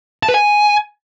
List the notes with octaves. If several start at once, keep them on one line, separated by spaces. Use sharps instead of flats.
A5
B4
G#5